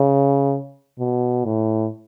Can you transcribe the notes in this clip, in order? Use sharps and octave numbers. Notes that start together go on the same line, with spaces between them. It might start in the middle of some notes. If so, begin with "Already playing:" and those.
Already playing: C#3
B2
A2